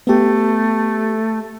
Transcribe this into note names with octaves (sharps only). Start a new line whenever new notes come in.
A3 B3 G4